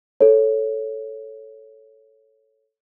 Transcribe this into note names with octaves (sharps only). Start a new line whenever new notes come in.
A4 C#5